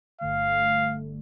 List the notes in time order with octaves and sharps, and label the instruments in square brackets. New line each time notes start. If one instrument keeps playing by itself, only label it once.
[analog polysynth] G1 G2 D3 A3 [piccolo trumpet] F5